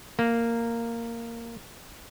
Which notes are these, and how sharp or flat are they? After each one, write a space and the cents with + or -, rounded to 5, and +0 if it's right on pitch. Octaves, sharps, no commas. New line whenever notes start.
A#3 -10